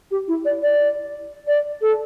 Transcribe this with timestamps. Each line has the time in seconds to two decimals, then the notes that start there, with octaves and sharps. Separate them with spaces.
0.11 G4
0.28 E4
0.45 D5
0.63 D5
1.48 D5
1.82 A4